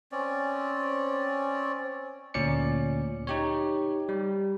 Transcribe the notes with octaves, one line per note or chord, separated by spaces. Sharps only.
C4 C#4 D5
D2 A#2 C#4 D5 C#7
D#4 G4 C#5
G3